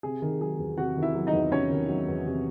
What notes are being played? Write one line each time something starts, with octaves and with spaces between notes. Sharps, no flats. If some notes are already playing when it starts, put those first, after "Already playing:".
C3 G#4
D#3
F#3 G#4
E2
C3 F#4 F#5
D#3
E4 E5
F#3
D#4 D#5
E2
C3 C#4 C#5
D#3
F#3
E2
C3